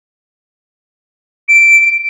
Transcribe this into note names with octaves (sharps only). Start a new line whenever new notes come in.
D7